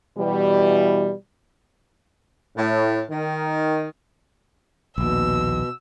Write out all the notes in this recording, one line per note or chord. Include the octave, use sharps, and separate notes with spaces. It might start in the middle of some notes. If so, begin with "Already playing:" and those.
B2 E3 G3
A2
D#3
A#1 D#2 B2 E6